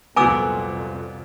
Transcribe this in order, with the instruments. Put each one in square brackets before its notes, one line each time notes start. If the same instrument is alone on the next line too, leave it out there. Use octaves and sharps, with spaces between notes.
[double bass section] C2 F2 [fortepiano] A#2 F#3 B3 [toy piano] G#5 D6 E6